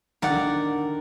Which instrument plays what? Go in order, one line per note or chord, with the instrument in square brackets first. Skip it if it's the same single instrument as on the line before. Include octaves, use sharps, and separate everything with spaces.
[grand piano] D#3 [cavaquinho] A#4 D5 F#5
[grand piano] D3
D#3